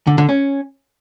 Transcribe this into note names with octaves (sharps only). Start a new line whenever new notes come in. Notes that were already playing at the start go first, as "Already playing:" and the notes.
D3
D3
C#4